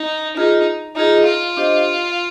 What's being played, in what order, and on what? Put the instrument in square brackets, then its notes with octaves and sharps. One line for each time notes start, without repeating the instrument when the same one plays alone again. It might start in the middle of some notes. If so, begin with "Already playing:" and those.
Already playing: [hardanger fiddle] D#4
[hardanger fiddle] D#4 [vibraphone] F4 G#4 D#5
[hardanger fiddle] D#4 [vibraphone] F4 G#4 D#5
[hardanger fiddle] F4
[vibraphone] D4 G4 C5 D#5